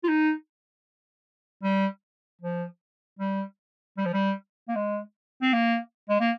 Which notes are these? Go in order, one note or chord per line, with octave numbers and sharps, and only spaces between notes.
F4
D#4
G3
F3
G3
G3
F3
G3
A#3
G#3
C4
A#3
G#3
A#3